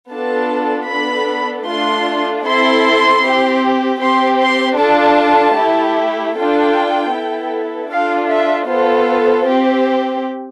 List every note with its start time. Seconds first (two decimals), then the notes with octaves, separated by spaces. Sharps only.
0.12 B3 D4 F4 A4 A5
0.89 B3 D4 A4 B5
1.67 A3 D4 F4 C6
2.45 C4 E4 A4 C6
3.23 C4 G4
4.01 C4 G4 C6
4.39 C6
4.78 D4 F4 A4 A5
5.56 A3 E4 G4
6.35 D4 F4 A4 G5
7.12 B3 E4 A4
7.90 D4 F4 A4 F5
8.29 E5
8.67 B3 F4 A4 C5
9.45 C4 G4